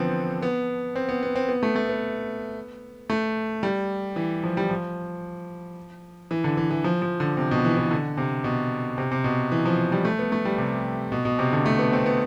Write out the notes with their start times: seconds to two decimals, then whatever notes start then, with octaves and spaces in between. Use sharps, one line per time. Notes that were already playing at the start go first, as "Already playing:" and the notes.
Already playing: D3 E3 F3 B3 C4
0.43 B3
0.96 C4
1.09 B3
1.23 B3
1.35 C4
1.49 B3
1.63 A3
1.76 A3
1.89 B3
3.10 A3
3.63 G3
4.16 E3
4.44 F3
4.57 G3
4.70 F3
6.31 E3
6.44 D3
6.57 E3
6.71 E3
6.84 F3
7.02 F3
7.20 D3
7.37 C3
7.51 B2
7.65 E3
7.77 E3
7.91 D3
8.17 C3
8.44 B2
8.98 C3
9.11 C3
9.24 B2
9.52 E3
9.65 F3
9.92 G3
10.05 A3
10.19 B3
10.32 A3
10.45 G3
10.58 C3
11.12 B2
11.25 B2
11.39 C3
11.52 D3
11.66 A3
11.79 B3
11.93 C4
12.06 B3